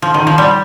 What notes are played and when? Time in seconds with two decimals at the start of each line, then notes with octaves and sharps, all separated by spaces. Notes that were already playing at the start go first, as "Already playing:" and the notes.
0.02 F3
0.14 D#3
0.27 F3
0.38 G3